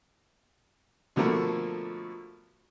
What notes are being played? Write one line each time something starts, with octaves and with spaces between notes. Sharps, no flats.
B2 D3 F3 A3 A#3